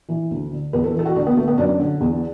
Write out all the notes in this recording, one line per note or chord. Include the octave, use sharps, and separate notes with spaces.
E3
D2
D3
E2 B4
A4
E3 A4
F#4
D2 D4
B3
D3 A3
B3
F#2 D4
D3
E2